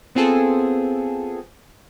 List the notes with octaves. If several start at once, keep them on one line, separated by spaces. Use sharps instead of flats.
B3 C4 F4 G#4 A4